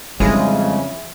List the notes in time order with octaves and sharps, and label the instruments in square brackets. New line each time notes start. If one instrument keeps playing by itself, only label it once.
[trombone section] F2 C#3 [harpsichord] E3 F4 G#4 [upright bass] G3 D4 [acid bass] G#3